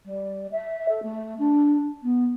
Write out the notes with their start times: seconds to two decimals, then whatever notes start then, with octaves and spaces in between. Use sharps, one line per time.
0.05 G3
0.51 E5
0.88 A4
1.02 A3
1.38 D4
2.03 B3